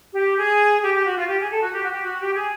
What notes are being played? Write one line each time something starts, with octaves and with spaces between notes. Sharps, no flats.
G4
G#4
G4
G4
F#4
F4
G4
G#4
A4
F#4
G4
F#4
G4
F#4
G4
G#4